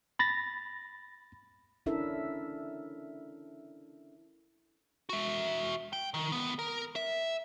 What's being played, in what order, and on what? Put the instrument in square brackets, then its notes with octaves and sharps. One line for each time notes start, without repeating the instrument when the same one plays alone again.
[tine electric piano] B5 A6 A#6
[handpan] C#4 D4 E4 A4 A#4 E5
[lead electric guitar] F#4 E5
G5
D#3
C#2 B3
A#4
E5